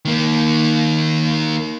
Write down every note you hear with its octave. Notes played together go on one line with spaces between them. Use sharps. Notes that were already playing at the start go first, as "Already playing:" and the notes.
D#3 A#3